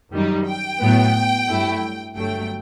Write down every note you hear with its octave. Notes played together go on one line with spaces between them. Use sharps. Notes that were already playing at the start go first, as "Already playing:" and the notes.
F#2 D#3 G3 D#4
G5
A2 F#3 B3
G2 F#3 A3 E4
G1 G2 F#3 A3 G5